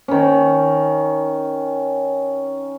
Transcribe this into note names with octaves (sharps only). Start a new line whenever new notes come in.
D#3 C#4